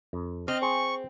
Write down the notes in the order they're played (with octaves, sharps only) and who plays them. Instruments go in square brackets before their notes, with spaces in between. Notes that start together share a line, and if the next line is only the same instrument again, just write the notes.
[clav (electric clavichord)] F2
[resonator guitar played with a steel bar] C4 [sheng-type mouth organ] D#5 F6
[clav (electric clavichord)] G#4 C5 [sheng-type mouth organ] C#6